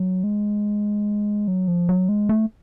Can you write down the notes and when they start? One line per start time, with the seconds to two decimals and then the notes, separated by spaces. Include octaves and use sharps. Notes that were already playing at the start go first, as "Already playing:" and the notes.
Already playing: F#3
0.24 G#3
1.48 F#3
1.68 F3
1.89 F#3
2.09 G#3
2.29 A3